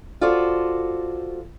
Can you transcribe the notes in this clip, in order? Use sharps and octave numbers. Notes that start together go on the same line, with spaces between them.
F4 F#4 A4 C5 D5